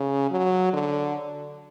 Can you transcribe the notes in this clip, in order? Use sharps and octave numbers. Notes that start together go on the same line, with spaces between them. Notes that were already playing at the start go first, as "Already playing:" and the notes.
Already playing: C#3
F#3
D3